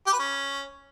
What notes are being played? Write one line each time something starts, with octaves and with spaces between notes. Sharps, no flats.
G4
B4
C#4